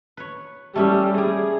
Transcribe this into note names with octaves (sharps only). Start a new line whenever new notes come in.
B4 C#5
G3 A3 C#4 E4
G3 G#4